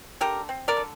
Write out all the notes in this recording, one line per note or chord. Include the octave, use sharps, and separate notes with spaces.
D3 G4 A#4
C4
A#4 D5
D3